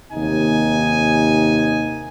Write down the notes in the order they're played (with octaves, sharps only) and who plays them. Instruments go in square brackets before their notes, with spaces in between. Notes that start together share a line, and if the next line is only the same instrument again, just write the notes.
[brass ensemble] D#2 C3 D#4 G#5